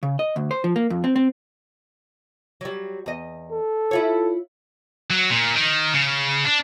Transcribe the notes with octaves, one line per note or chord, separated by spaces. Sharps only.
C#3
D#5
D2
C5
F3
A#3
F2
C4
C4
F#3 G3
E2 D#5
A4
E4 F4 C#5
F#3
A#2
D#3
C#3
D4